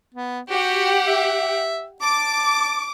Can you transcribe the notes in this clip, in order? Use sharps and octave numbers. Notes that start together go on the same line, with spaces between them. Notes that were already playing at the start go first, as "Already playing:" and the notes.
B3
F#4 G4 F#5
E5
A5 D6